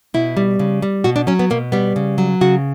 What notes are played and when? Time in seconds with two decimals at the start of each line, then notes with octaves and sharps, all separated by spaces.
0.14 B2 E4
0.37 G3
0.59 C#3
0.82 G3
1.04 B2 F#4
1.16 D4
1.27 F#3 C#4
1.39 B3
1.50 B2 A#3
1.72 G3 B3
1.96 C#3
2.18 F#3
2.41 C#3 F#4